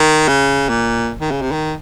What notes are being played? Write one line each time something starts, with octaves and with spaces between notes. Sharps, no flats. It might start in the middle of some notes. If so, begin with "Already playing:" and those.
Already playing: D#3
C#3
A#2
D#3
C#3
C3
D#3